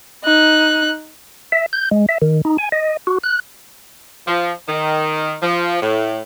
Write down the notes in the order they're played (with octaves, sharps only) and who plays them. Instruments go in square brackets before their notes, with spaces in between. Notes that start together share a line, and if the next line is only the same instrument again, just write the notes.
[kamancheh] D#4 F#6
[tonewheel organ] E5
G6
G#3
E5
D#3
D#4
G#5
D#5
F#4
F#6
[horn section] F3
D#3
F3
A2